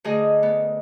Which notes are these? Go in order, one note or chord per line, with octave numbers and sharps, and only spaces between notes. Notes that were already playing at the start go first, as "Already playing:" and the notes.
D2 G#4 D#5
B3